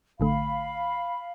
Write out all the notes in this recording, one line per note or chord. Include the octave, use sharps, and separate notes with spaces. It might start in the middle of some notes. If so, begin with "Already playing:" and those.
A1 D3 A3 F5 B5